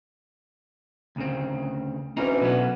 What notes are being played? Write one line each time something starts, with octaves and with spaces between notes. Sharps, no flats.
D2 C#3 C4
D2 E3 C4 C#4 D#4 A#4
B2 F#3 B3